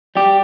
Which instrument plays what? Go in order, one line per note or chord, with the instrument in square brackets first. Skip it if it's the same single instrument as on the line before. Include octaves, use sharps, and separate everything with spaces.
[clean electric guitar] G3 G4